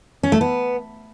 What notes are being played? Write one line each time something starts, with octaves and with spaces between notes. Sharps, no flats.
C#4
A3
B3